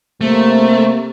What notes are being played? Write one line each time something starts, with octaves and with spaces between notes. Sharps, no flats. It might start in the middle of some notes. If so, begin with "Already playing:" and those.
C3 A3 A#3